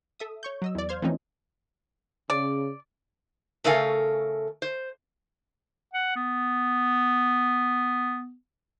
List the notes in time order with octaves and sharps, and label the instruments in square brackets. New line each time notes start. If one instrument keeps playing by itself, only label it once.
[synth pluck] A4 E5 D#6
C#5 C#6 G6
F#3 D#5 E6
E2 D5
C5 F5 C6 F6 G#6
E3 F3 A3 C4 C#4 D#4
[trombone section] C#3 [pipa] D5
[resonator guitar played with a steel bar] C#3 A3 A4 A#4 F5 G#5
C5
[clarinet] F#5
B3